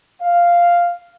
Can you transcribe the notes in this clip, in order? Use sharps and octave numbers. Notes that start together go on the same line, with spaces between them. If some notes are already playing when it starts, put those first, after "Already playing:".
F5